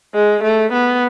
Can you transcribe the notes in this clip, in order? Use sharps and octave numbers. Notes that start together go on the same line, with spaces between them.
G#3
A3
B3